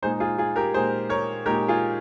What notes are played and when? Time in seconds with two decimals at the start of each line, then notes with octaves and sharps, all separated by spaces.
0.02 A#2 G#3 D#4 G#4 C5
0.20 F4 G#4
0.38 F4 G#4
0.56 G4 A#4
0.74 A#2 G#3 D#4 G#4 C5
1.09 A#4 C#5
1.45 A#2 G#3 D#4 G4 A#4
1.68 F4 G#4